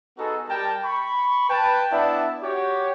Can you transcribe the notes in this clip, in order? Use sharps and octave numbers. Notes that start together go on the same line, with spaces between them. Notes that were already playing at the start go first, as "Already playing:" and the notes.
B3 D#4 F#4 G#4 A4
G3 G4 A#4 G5 A5
B5 C#6
B4 G5 A5
B3 D4 E4 D5 E5 A5
F#4 G4 C#5